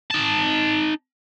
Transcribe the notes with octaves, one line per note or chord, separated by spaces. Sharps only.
D#4 A5